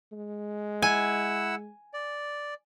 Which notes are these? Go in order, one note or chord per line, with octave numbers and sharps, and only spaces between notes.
G#3
E4 F#5 G#5 E6
D5